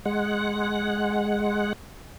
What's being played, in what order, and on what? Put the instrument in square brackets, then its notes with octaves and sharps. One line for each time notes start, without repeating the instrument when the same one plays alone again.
[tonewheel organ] G#3 F#5